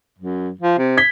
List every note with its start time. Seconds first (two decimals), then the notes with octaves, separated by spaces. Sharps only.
0.19 F#2
0.61 F3
0.78 C3
0.97 G#6 B6 G7